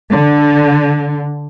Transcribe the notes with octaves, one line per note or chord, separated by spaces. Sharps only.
D3